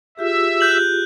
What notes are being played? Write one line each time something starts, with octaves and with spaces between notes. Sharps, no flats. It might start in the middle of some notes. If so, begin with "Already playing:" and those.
F4 G4 G#4 E5
F#6 G6 F#7